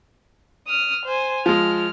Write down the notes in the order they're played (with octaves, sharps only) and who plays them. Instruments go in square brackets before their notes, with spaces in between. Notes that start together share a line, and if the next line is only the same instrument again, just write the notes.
[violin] D#6 F6
C5 G#5
[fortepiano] F3 G#3 [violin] F6